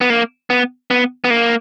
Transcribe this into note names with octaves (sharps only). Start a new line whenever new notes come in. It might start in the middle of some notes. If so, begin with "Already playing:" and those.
B3
A#3
B3
B3
B3
A#3